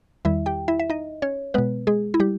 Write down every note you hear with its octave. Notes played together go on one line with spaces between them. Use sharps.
E2 D#3 G3 E4 E5
G4 G5
E4 E5
E5
D#4 D#5
C#4 C#5
B2 G#3 B3 B4
G#3 G#4
E4
G3 G4